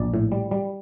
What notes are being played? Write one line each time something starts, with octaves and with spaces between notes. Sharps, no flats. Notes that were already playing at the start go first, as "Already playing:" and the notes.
Already playing: A#1 D5
A2
G3
G3